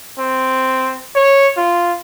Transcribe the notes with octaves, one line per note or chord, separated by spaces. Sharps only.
C4
C#5
F4